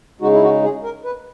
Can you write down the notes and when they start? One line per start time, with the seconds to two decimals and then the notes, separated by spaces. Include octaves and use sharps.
0.21 C#3 G#3 D#4 F#4
0.33 E4
0.43 F#4
0.63 G#4
0.83 A#4
1.05 B4